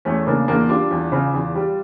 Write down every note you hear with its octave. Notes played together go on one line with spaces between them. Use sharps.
E2 A3 C#4
C#3 A#3 D4
E2 A#3 D4
G3 D4 F4
E2
C#3
E2
G3